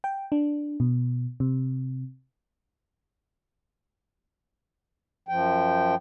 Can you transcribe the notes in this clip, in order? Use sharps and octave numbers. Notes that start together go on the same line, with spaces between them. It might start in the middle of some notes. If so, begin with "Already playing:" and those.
G5
D4
B2
C3
F#2 F3 G5